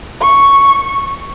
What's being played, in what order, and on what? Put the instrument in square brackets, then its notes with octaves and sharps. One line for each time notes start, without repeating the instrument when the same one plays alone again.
[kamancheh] C#6